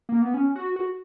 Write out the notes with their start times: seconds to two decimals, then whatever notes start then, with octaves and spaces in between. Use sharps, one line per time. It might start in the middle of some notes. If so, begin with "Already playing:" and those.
0.09 A#3
0.22 B3
0.34 C#4
0.55 F#4
0.76 F#4